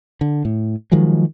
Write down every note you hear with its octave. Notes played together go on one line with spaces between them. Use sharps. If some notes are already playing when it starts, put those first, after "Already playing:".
D3
A2
D#3 F3 F#3 G#3